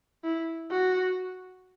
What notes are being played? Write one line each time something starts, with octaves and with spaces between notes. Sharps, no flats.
E4
F#4